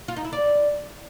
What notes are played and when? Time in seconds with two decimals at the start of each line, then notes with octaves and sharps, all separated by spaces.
0.08 F4
0.16 D#4
0.25 E4
0.33 D5